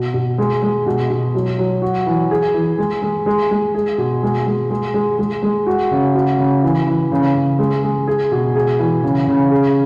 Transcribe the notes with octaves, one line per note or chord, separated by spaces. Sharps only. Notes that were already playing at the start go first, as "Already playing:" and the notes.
Already playing: B2
B2
G#3
G#3
B2
B2
F#3
F#3
F#4
E3
G#4
E3
G#3
G#3
G#3
G#3
G#4
B2
G#3
G#3
G#3
G#3
G#3
G#3
F#4
C#3
F#4
C#3
E3
E3
C#3
C#3
G#3
G#3
G#4
B2
G#4
E3
C#3
C#3
G#4